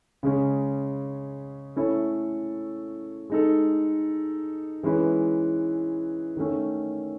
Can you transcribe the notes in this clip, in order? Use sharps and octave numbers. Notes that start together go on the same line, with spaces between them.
C#3 G#3 C#4
A3 C#4 E4 A4 C#5
G#3 D#4 A4
E3 G#3 C#4 E4 B4
D#3 A3 C#4